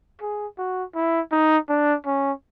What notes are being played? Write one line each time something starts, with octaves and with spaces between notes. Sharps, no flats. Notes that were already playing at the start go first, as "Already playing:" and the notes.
G#4
F#4
E4
D#4
D4
C#4